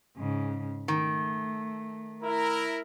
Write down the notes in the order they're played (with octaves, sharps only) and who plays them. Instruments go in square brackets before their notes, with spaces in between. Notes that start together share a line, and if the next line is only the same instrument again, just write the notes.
[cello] G#2 C#3
[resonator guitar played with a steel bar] D#3 [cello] A3
[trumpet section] E4 A#4